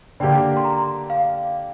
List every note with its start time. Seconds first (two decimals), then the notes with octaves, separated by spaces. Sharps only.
0.20 D3 A#3 G4 G5
0.57 C6
0.65 A#5
1.10 F5